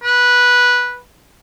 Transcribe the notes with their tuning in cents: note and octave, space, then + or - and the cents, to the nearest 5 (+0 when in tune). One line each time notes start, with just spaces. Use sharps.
B4 -10